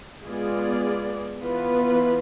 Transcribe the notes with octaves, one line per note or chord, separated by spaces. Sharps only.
G#3 B3 F4 G#4 D5
E3 B3 F4 B4